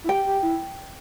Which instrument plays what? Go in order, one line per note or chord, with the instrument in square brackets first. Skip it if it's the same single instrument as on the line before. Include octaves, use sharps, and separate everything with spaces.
[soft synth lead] E4
[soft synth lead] G4 [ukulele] G5
[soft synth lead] G4
E4